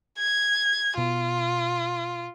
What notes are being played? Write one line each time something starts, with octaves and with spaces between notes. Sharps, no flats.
G#6
B2 B3 F4